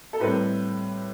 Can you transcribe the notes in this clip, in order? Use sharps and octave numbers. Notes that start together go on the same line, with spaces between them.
A4
A2 G3 C4 B4